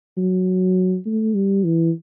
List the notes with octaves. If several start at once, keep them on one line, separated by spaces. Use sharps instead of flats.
F#3
A3
G3
E3